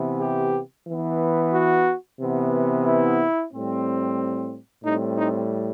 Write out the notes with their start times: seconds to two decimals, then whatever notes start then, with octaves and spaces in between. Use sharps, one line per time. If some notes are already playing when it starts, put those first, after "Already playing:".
Already playing: C3 E3 B3
0.21 G4
0.87 E3 B3
1.54 F#4
2.20 C3 E3 B3
2.86 E4
3.52 A2 G3 C4
4.84 A2 G3 C4 D#4
5.17 D#4